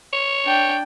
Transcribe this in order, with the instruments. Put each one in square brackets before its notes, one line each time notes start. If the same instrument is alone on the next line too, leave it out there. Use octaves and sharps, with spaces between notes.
[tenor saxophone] C#5
[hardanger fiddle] D4 G5